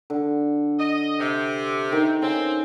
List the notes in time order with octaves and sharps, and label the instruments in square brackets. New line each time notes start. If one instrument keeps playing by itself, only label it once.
[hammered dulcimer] D3
[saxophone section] D#5
C3
[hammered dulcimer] D#3
[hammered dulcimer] C#3 G#5 [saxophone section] C4